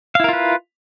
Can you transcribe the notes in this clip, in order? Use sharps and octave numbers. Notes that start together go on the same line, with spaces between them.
E4 F4 A#4 B4 F5